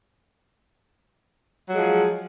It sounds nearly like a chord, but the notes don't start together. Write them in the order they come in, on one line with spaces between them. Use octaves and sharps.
F#3 G#3 F3 G#4